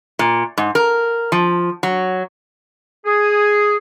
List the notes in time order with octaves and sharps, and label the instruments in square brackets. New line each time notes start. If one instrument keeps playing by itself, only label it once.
[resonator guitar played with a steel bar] A#2
G#2
A#4
F3
F#3
[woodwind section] G#4